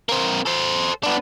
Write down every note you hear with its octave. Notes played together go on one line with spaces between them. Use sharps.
A#3 C4
A4 C5
B3 D4